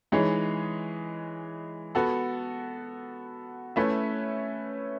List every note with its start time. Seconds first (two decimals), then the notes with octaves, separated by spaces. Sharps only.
0.12 E3 G#3 D#4 G#4 C#5
1.95 B3 F#4 A4
3.76 A3 C#4 E4 B4 E5